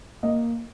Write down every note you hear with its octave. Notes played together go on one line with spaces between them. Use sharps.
A#3 D#5